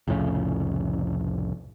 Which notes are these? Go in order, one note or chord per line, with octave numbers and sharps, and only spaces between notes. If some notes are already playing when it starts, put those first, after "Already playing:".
C2 F2 A2 C#3